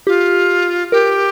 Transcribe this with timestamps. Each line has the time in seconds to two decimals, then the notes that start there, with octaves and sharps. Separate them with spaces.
0.07 F4 G4
0.92 G4 A#4